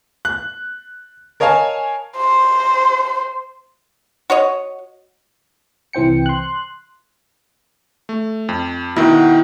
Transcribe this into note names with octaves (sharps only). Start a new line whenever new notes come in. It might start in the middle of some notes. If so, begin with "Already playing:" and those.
F#6
A#4 C#5 D#5 F5 G#5 A5
C5
F#4 C#5 D#5
C2 E3 C4 G5 C#7
C6 F#6
A3
F2
B2 D#3 E4 F#4 F#5 G5